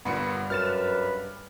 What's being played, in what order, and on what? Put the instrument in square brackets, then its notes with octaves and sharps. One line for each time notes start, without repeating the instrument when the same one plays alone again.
[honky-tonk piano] G1 A#2 [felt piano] G2 C#7 [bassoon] B3
[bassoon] F#2 [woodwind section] B4 [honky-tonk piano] F6 A6 E7